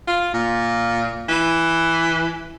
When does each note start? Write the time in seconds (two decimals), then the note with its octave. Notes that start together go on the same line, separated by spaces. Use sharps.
0.07 F4
0.34 A#2
1.28 E3